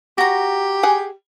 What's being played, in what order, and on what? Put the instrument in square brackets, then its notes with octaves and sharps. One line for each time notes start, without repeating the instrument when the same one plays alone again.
[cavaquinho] F#4 A#5 [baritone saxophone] G4
[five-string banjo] G#4 F#5 G#5